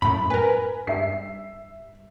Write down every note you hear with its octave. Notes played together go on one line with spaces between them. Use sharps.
F#2 A2 B5
A#4 B4 G#5
G2 E5 C7